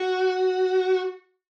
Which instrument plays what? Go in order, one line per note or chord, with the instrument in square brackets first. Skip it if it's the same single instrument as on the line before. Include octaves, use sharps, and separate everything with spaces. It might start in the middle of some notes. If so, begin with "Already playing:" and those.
Already playing: [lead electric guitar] F#4